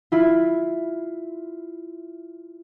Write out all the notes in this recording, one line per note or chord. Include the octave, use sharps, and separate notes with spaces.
E4 F4